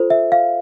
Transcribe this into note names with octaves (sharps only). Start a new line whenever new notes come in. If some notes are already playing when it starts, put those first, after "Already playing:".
Already playing: F4 A4 C5
E5
F5